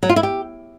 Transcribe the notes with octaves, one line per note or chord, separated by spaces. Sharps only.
F#3
F4
E4
G4